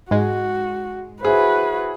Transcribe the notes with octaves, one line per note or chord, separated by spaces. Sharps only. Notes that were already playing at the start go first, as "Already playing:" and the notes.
G#2 G#3 F#4
E4 F#4 G#4 B4 C5